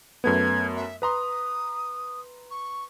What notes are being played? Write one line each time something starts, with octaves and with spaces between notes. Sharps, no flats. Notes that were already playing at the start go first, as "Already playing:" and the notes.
F#2 A3 B3 G#6
E5
B4 A#5 C6 D#6
C#6